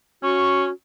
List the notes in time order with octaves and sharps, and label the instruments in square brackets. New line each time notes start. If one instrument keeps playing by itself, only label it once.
[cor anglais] C#4 [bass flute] F#4 [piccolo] C#6